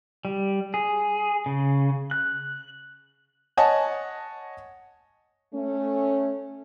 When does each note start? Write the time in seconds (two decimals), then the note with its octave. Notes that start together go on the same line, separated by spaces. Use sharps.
0.25 G3
0.74 G#4
1.46 C#3
2.11 F#6
3.57 C#5 D#5 F#5 G#5 A5
5.54 A3 C#4